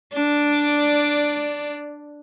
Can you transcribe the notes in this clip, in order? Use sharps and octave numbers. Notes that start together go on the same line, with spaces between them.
D4 D5